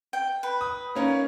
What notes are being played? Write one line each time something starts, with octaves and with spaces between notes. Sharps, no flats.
G5
B4
D#6
A#3 C#4 D#4